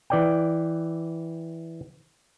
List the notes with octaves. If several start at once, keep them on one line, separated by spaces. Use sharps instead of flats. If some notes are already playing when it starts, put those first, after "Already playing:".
E3 D5 G5